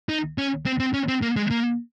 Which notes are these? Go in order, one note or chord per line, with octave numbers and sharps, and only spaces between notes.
D#4
C#4
C4
C4
C#4
C4
A#3
G#3
A#3